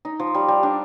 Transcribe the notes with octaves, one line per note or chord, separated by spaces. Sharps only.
D#4
F3
G3
G3
D4